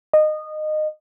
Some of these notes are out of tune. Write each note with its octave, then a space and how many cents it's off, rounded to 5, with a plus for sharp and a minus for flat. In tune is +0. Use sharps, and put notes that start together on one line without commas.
D#5 -20